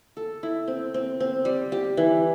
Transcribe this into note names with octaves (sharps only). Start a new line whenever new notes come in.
A4
E4
C4
C4
C4
G3
G4
E3